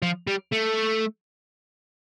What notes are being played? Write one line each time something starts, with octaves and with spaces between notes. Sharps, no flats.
F3
G3
A3